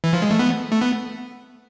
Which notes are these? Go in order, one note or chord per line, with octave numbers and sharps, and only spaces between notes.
E3
F3
G#3
A3
B3
A3
B3